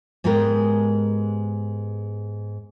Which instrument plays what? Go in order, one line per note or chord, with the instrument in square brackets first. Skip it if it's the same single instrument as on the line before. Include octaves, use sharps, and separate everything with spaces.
[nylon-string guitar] G#2 G#3 B3 G4 A#4